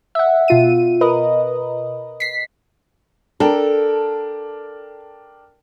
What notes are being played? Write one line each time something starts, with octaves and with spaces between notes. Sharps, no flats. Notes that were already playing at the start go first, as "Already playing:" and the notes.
E5 F#5
B2 F4 D#7
A#4 B4 D#5
B6 C7
D4 A4 A#4 G5